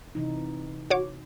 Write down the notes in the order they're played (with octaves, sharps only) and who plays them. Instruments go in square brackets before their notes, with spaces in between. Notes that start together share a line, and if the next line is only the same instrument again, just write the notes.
[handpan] C3 E3 D#4
[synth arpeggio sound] F#4 C#5 D6